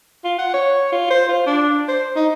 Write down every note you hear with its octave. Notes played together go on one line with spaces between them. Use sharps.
F4
F#5
C#5
F4
C5
F4
D4
C5
D#4